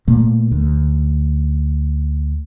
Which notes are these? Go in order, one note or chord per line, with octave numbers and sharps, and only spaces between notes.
A#2 A3 A#3
D2